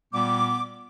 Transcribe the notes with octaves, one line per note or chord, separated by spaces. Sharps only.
A#2 G3 B3 D6